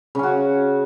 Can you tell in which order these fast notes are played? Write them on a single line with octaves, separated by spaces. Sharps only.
C#3 C#4 F#4